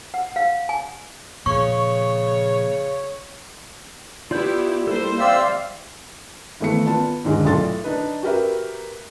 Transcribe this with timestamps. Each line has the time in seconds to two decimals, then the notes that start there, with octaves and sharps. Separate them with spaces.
0.14 F#5
0.36 F5
0.69 G#5
1.46 A#2 C#3 F3 A#3 C#5 C#6
4.31 B3 E4 F4 G4 D5 G6
4.87 G3 A#3 E4 A4 C5
5.20 C4 D5 E5 F5 E6
6.60 G#1 E3 A3 B3 C#7
6.86 B3 F4 A5
7.25 D#2 G#2 D3 G#3
7.45 B1 A2 F4 A4 C6 A6
7.84 D4 D#4 B4
8.23 F#4 G4 A#4 B4 E5